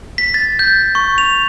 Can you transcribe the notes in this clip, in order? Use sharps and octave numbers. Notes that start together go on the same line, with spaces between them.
B6
A6
G6
C#6
F7